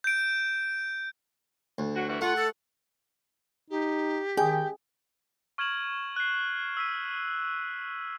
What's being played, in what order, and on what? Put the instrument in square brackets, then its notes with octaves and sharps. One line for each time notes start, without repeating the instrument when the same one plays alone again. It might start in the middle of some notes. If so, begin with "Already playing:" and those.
[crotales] G6 D7
[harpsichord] D2
[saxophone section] F#3 F#4
E3 G3 F#4
[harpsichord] A3 [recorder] F4 [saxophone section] F#5
[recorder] A4
[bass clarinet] D#4 [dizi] G4
[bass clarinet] D#3 [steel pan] G#4 [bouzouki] G5
[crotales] C#6 F6 G#6 D7 E7 F#7
F#6 C7
E6 B6 D#7